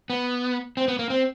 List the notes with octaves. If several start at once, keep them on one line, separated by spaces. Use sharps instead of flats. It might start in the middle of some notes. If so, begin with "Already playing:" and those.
B3
C4
B3
A#3
C4